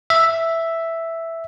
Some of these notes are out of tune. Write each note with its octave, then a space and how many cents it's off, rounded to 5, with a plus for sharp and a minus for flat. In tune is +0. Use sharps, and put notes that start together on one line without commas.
E5 +0